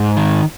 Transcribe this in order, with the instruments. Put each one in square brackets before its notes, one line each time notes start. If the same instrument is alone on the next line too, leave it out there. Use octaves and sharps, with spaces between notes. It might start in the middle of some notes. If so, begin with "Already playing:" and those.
Already playing: [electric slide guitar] G#2
D#3